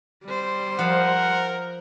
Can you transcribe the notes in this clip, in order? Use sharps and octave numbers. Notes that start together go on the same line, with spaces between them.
G3 C5
F3 A#4 F#5